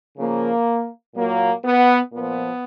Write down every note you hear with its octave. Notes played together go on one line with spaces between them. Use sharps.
C#3 F3 A#3
A#2 F#3 A#3
B3
A#2 F3 B3